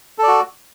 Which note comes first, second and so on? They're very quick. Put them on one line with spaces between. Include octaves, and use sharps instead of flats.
A4 D5 F#4